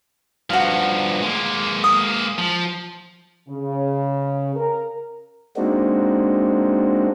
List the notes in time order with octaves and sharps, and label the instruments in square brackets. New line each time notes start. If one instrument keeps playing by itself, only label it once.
[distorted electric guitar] G2 F3 [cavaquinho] F#4 F5
[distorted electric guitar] G#3 A#3
[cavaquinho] D#6
[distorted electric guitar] F3
[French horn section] C#3
A#4
[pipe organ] G#3 A#3 C4 D4 D#4 F#4